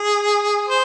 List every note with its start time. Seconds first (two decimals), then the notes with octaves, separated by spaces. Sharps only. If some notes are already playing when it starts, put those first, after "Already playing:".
Already playing: G#4
0.68 C5